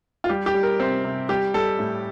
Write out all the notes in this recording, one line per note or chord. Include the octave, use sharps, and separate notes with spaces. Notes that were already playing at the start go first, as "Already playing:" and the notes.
F4
G3 G4
G4
G3
A#4
C3 C4
C3
G3 G4
G3 A4
A2